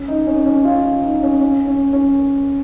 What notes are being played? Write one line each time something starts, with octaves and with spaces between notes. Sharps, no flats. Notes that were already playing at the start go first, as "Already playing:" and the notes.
Already playing: C#4
D#4
C#4
C#4
F4
F4
D#4
C#4
C#4
C#4
C#4